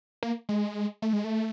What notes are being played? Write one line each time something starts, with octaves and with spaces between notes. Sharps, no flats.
A#3
G#3
A3
G#3
A3